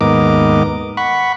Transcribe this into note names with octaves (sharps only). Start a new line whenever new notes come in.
D#2 G#2 B3 A#4 D#5 D6
F#5 B5 C#6